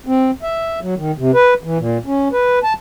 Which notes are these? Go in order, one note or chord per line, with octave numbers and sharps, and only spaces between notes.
C4
E5
F#3
D#3
C3
B4
E3
A#2
C#4
B4
A5